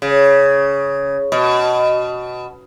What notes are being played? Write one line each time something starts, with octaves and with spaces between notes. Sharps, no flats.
C#3
B2